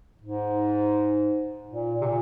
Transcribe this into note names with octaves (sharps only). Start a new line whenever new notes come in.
G#2
A#2
C3
A#2